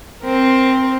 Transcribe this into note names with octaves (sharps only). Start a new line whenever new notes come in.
C4 A#4